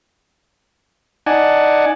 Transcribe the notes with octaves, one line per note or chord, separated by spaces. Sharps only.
D#4 D5 F#5 G#5 A5